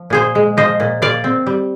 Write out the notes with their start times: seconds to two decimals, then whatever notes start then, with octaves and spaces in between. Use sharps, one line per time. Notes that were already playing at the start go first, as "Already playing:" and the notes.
Already playing: F3
0.10 A#2 G#4 C5
0.35 G#3
0.57 F3 C5 D#5
0.80 A#2
1.02 A#2 D5 F5
1.24 C4
1.47 G3